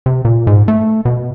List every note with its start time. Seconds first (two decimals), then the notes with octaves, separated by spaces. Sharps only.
0.06 C3
0.25 A#2
0.47 G#2
0.68 A3
1.05 B2